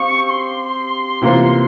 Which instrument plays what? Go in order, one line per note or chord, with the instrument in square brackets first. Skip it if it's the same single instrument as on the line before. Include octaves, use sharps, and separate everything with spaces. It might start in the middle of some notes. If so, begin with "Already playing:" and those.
Already playing: [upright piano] C4 G4 F5 [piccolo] C#6
[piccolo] C6
[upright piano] C3 E3 A#3 F4 C5